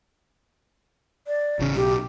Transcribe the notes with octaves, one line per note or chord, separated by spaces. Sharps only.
D5
A1 C#3
B1 G4